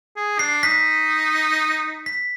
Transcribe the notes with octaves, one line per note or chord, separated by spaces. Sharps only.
G#4
D4 C7
D#4 B6
B6